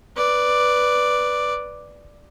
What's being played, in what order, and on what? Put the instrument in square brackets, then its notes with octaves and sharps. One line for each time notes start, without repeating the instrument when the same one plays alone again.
[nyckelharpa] B4 D5